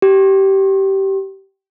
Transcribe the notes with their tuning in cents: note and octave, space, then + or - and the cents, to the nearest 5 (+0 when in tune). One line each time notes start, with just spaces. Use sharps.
G4 -20